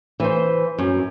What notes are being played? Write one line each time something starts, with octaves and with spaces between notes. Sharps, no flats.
E3 C5
F#2